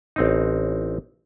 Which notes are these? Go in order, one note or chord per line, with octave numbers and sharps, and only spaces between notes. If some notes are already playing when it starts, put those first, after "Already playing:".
A1 C4 D#4